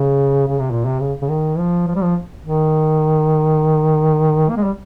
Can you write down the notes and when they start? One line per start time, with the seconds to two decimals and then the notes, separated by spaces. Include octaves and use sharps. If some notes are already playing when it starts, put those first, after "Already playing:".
Already playing: C#3
0.47 C#3
0.59 C3
0.71 A#2
0.85 C3
1.00 C#3
1.21 C#3
1.29 D#3
1.58 F3
1.87 F3
1.95 G3
2.03 F3
2.45 D#3
4.49 A#3
4.57 G#3
4.64 G3